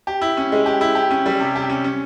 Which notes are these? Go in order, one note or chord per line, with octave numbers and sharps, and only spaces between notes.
G4
E4
C#4
G#3
G4
E4
G4
C#4
G3
C3
G4
C#4
C#4